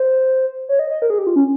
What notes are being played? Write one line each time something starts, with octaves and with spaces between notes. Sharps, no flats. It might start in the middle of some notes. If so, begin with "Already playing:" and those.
Already playing: C5
C#5
D#5
D#5
A#4
G#4
G4
F4
C#4